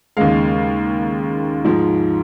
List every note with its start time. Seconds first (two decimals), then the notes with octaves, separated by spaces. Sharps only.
0.17 D#2 C#3 G#3 F5
1.65 G#2 F3 G#3